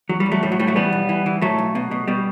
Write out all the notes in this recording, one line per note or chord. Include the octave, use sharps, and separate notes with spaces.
E2 F#3
G3
E2
F#3 A3
A2 G3
F#3
A2 G3
F#3 A3
E3 G3 B3
B1
E3
E3
A2 F#3 A3
B1
B2
B2
B2 G3